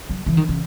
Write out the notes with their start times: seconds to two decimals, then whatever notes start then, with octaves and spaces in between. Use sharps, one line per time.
0.10 F#3
0.26 E3
0.37 D#3
0.49 C#3